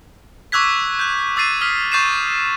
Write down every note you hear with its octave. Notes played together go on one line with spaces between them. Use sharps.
C#6 D6 E6 F#6 G#6 B6
F#6 G6
D6 E6 A6 C7 D#7
D#6 F6 B6
C#6 G6 A6 C7 D#7 E7